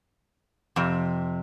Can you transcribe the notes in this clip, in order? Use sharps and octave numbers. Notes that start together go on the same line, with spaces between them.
F2 C3